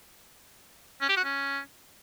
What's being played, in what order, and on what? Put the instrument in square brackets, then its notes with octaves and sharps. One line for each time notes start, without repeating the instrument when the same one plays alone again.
[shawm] C#4
G4
F#4
C#4